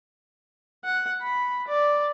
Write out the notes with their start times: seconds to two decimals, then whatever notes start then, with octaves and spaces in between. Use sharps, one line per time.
0.84 F#5
1.21 B5
1.67 D5